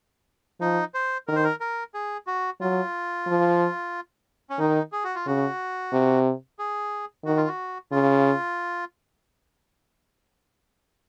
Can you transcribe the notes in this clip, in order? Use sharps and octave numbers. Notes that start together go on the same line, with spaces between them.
F3 D#4
C5
D#3 A#4
C5
A#4
A#4
G#4
F#4
F#3 F4
F3
C#4
D#3 D#4
G#4
F#4
F4
C#3 F#4
C3
G#4
D#3 F#4
F4
F#4
C#3 F4